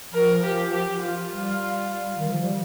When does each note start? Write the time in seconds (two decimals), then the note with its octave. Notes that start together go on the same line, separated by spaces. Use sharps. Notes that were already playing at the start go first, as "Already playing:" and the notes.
0.12 F3 A#4
0.43 G4
0.73 G4
1.02 F4
1.32 G3
2.18 D#3
2.29 F3
2.41 G3